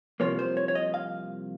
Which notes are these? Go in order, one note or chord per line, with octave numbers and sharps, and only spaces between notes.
C2 C3 F3 A#3 C#5
C5
C#5
C#5
D#5
F5